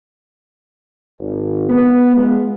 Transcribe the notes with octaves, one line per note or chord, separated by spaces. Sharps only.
G#1
B3
G#3 F4